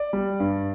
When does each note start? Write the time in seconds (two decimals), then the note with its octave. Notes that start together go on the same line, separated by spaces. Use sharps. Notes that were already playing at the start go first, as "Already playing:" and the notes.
Already playing: D5
0.13 G3
0.40 G2